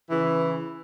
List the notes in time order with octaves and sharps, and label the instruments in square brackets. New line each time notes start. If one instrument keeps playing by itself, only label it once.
[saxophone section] C#3 E3